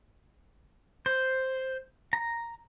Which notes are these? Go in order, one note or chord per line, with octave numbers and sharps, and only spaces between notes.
C5
A#5